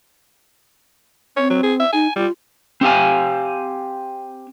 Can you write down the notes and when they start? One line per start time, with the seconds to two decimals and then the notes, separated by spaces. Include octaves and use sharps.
1.36 C4 C#5
1.50 F#3
1.63 G#4
1.79 E5
1.92 D#4 G#5
2.16 G3 F4
2.81 C4 G4 F5 G#5